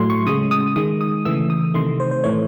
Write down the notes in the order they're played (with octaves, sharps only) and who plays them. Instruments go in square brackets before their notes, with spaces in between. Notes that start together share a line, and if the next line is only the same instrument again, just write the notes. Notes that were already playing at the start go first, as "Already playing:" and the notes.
Already playing: [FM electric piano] A2 F#3 A3 C6
C#6
C#3 D#6
G#3
D#6
D#3 G#3 D#6
D#6
C#3 E3 A3 E6
D#6
C3 D#3 A3 C6
C5
C5
A2 E3 A3 C#5